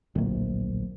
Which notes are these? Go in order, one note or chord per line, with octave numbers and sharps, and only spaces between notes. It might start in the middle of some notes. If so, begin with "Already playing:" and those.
D1 A#1